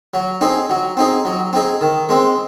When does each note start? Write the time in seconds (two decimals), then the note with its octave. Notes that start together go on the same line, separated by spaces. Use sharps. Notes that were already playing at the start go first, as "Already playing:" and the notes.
0.14 F#3
0.41 C4 D#4 G#4
0.70 F#3
0.97 C4 D#4 G#4
1.25 F#3
1.53 C4 D#4 G#4
1.81 D#3
2.09 G#3 C4